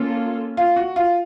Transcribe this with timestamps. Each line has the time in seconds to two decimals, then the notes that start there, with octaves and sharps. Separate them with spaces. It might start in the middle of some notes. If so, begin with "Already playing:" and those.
Already playing: A#3 C#4 F4 A4
0.57 F4
0.76 F#4
0.96 F4